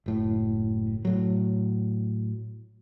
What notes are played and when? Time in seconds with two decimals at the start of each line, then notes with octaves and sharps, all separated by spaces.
0.06 F#1 A2
1.05 A2 F#3